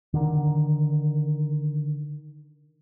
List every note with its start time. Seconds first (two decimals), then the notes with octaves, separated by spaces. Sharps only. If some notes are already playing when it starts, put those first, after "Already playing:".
0.14 D3 D#3